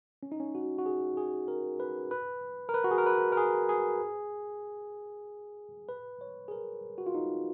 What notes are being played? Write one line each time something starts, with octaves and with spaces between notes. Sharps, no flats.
C#4
D#4
C#4
F#4
F#4
G#4
G#4
A#4
B4
B4
A#4
B4
F#4
G#4
A#4
B4
A#4
G#4
G#4
B4
C#5
G#4
A#4
F#4
F4
D#4